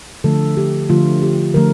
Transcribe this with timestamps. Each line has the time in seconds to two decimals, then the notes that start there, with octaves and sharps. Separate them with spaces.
0.24 D3 F3 A3 A4
0.57 G4
0.89 D3 F3 A3 F4
1.22 G4
1.54 D3 F3 A3 A#4